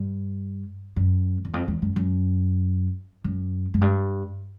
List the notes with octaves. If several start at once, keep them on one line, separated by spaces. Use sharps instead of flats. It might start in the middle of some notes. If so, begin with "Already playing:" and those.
Already playing: G2
F#2
E2
F2
E2
F#2
F#2
F#2
F#2
G2